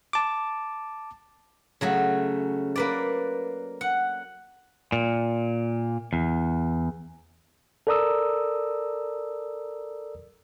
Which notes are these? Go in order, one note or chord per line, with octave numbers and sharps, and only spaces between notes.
A5 D6
C#3 F#3 A3
A#3 B4 D5
F#5
A#2
E2
A4 A#4 D5 A#5 D#6 E6